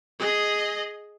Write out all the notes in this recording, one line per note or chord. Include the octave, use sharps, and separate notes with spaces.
G#4 D#5